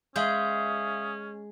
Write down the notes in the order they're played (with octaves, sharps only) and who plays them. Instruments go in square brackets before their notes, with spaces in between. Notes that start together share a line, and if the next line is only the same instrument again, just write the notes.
[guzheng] G#3 [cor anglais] C#4 [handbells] E5 F5 G6 [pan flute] D#6